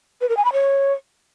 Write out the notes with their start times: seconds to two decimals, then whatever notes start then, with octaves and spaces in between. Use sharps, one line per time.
0.21 B4
0.29 A#4
0.37 G#5
0.45 B5
0.53 C#5